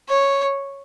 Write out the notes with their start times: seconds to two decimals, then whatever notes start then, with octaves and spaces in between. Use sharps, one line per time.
0.09 C#5